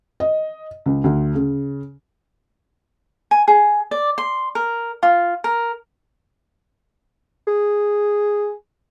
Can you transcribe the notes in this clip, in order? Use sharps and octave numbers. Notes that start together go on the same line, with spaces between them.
D#5
C#2
D2
C#3
G#5
G#4
D5
C6
A#4
F4
A#4
G#4